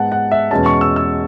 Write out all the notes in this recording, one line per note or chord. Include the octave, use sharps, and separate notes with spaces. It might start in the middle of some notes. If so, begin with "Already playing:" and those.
Already playing: G#2 G#3 B3 F#5 A5
F#5
E5
E2 B2 G#3 C#4 A5
C#6
E6
E6